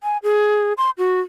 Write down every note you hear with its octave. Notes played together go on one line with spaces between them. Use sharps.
G#5
G#4
C6
F#4